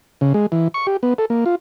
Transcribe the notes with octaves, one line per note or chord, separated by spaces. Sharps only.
C#3
G#3
E3
C#6
G4
B3
A4
A#3
F4